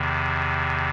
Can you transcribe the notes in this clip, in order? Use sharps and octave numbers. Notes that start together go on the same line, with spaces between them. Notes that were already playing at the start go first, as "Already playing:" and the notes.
Already playing: E2 C3 D#3